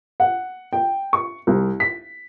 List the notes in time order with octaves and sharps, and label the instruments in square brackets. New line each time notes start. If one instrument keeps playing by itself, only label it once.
[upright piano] F#5
G5
C#6
C2
B6